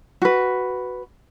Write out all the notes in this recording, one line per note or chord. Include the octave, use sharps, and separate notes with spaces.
F#4 B4